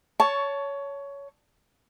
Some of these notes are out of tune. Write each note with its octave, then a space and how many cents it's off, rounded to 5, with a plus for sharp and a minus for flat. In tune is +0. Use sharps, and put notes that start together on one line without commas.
C#5 +15 A5 +0 C#6 +10